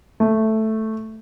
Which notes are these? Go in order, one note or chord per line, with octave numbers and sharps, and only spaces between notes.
A3